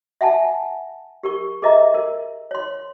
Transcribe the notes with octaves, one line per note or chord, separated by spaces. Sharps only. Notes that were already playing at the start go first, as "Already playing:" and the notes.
E5 F#5 G#5 A5
G4 A#4 C#6
G#4 A#4 D#5 E5 A#5
A#4
C#5 C6